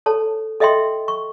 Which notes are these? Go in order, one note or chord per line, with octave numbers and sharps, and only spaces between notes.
A4 C#5 A5
A4 D#5 E5 G5 C6
C#6